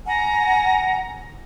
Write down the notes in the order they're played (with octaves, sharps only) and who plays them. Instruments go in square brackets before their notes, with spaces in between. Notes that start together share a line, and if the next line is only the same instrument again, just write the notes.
[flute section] F#5 G#5 A#5